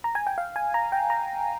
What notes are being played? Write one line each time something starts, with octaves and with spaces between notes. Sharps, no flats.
A#5
G#5
G5
F5
G#5
A#5
G5
A#5